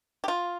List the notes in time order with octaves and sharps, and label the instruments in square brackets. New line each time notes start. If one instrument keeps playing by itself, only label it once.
[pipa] G4
[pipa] F4 [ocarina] F5